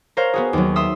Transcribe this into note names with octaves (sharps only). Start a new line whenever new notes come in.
A#4 C5 C#5 F5
B3 F#4 G#4
D#2 F#3
E5 C6 D#6 E6